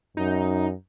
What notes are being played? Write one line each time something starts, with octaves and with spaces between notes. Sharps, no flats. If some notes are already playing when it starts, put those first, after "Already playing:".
F#2 D#4